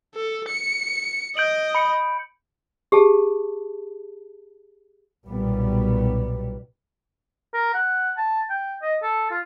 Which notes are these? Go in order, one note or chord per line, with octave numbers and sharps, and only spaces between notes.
A4
C#7
D#5 G6 D7 F#7
B5 C#7
G4 G#4 A5
B1 A#2 G3 B3
A#4
F#5
A5
G5
D#5
A4
F4